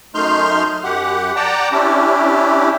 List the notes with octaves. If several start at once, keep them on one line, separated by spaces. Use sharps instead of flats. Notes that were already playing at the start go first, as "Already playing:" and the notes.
F#2 A3 D#4 C6 F6 G6
F#2 G4 F#5
D5 F#5 G5 A5 A#5
C#4 D4 E4 G4